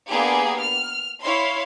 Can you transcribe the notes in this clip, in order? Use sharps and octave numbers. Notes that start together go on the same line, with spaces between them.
A#3 B3 D4 G4 G#4
F6
E4 C#5 F5 C6